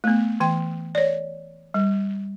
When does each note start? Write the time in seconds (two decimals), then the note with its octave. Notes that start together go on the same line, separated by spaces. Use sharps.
0.04 A3 B3
0.40 E3 G5
0.95 C#5 D5
1.74 G3